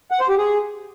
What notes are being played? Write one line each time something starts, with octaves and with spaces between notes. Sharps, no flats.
F#5
C5
G4
G#4